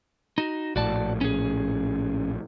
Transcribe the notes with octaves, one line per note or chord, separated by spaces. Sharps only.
D#4 F#4
A#1 A2 F#4 D5 A5
C#4 G#4